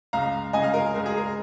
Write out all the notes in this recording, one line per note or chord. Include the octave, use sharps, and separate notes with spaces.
C#2 C#3 G#3 F5 A#5
C#2 C#3 G#3 D#5 G#5
F5
A#4 D#5
C#2 C#3 G#3 A#4
G#4
A#4